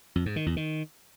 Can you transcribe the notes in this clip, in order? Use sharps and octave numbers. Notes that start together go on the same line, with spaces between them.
F2
G#2
D#3
E2
D#3